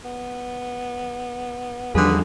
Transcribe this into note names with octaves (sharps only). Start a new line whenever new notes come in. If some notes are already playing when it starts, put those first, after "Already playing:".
B3
E2 D3 F3 G3 G#4 B4